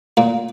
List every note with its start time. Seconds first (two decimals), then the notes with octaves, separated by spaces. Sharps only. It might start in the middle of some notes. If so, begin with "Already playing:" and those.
0.17 A#2 A#3